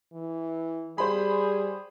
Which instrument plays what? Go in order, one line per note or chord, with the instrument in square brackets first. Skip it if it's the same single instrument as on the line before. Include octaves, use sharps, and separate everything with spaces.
[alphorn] E3
[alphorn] G3 [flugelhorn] G#4 [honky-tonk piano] C5 B5